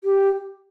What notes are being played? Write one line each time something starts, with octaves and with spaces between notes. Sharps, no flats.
G4